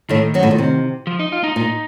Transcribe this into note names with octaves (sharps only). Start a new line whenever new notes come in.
A2 D#3 A3
F#2 F#3
A2
A#2
C3
F3
D#4
F4
D#4
A#2 D#4